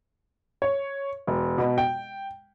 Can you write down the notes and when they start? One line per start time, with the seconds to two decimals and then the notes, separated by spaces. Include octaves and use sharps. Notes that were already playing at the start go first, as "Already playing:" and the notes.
0.62 C#5
1.27 E1
1.58 B2
1.78 G5